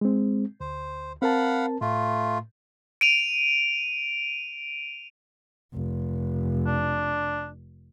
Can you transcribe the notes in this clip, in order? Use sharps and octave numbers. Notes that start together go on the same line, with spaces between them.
G#3 C4
D2 C5
C4 A#4 F5 F#5 A5 B5
A2 A3 F4
D7 D#7 F7
F1
D4